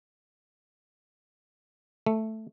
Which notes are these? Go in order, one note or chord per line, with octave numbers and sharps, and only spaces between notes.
A3